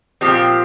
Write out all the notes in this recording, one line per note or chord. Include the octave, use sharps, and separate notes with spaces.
A#2 F3 C4 G4